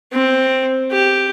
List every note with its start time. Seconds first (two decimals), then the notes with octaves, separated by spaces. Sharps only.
0.12 C4
0.91 G4